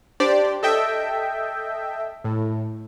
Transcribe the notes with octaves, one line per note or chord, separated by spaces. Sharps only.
D4 G4 C5 D5
A4 D#5 E5 G5
A2